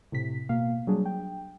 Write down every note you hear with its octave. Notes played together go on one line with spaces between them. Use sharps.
A2 C3 B6
B2 A#3 F5
F#3 G3 D4 G#4
G5